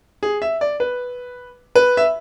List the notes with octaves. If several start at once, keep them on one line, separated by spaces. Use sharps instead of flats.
G#4
E5
D5
B4
B4
E5